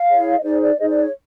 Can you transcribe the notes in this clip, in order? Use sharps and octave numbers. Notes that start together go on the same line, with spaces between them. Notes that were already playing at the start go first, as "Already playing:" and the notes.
Already playing: F5
E4 G#4 C#5
D#5
D#4 G#4 C5 D5
D5
D#4 G#4 C5 D#5
D5
C#5